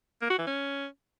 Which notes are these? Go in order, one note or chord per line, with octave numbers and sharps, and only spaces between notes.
A#3
F#4
E3
C#4